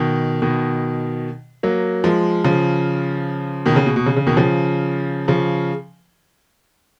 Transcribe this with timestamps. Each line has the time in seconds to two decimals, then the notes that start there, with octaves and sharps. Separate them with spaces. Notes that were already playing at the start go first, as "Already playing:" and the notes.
Already playing: B2 D#3
0.42 B2 D#3
1.63 F#3 A#3
2.04 F3 G#3
2.44 C#3 F3
3.66 B2 D#3
3.76 C#3
3.86 B2
3.96 B2
4.06 C#3
4.16 C#3
4.27 B2 D#3
4.37 C#3 F3
5.28 C#3 F3